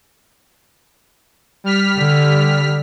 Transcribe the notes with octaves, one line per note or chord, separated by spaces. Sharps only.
G3 F6 B6
D3